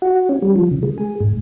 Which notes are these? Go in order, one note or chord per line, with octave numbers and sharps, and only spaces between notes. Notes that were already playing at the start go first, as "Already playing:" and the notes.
F#4
C#4
G3
F3
C#3
G#3
G#4
G#2